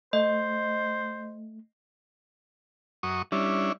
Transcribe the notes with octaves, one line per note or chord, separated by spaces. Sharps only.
A3 C5 D#5
F#2 C#6 D#6
G3 C#4 D4 E4